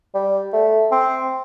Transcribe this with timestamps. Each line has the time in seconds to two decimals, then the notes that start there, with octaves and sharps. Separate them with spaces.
0.14 G3
0.53 A3
0.91 C4